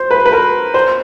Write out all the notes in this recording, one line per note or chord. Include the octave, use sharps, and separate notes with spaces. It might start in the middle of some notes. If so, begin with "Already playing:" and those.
Already playing: C5
B4
B4
A#4
C5